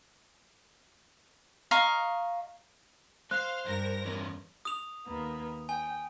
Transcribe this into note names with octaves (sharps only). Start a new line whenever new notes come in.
D#5 F5 A#5 C#6
C5 F5 F#6
G2 A#4 A#6
E2 B3 C#4
D#6 F7
D#2 A#3 B3
G5 G#5